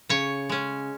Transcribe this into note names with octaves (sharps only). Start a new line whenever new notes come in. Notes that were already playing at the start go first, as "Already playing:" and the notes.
C#3 C#5
G#3 C#4